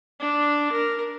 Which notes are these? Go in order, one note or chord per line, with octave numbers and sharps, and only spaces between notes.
D4
A#4